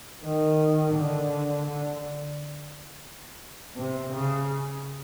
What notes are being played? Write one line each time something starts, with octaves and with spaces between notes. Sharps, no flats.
D#3
D3
D3
C3
C#3